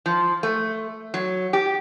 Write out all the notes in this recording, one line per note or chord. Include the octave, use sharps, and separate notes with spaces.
F3
A3
F#3
G4